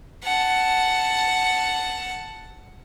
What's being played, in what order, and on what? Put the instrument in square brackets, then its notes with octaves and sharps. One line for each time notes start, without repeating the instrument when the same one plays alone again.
[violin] F#5 A5